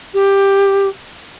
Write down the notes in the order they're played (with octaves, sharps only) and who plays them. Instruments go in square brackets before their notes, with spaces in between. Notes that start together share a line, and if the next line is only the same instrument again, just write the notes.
[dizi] G4